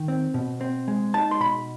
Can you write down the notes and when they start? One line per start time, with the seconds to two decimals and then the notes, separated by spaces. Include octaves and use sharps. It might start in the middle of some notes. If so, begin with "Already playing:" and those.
Already playing: D#3
0.08 C4
0.34 B2
0.61 C4
0.88 G#3
1.14 D#4 A5
1.31 C6
1.40 B2 B5